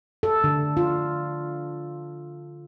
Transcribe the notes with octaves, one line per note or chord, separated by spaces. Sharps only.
A4
D3
F4